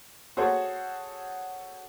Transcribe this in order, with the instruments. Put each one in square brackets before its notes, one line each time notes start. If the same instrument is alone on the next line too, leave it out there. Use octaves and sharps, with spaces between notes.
[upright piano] F#4 G#4 A4 C5 C#5